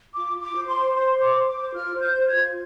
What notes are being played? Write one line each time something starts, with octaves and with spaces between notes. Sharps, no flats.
F4 D6
F4
D6
C5
C6
C5
C5 C6
C5
D6
C5
D6
C5
F4 F6
C5
G6
C5
G#6
F4